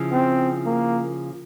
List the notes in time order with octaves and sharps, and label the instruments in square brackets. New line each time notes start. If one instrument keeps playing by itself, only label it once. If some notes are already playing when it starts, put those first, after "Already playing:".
Already playing: [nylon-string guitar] C#3 F3 E4
[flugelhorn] C4
A#3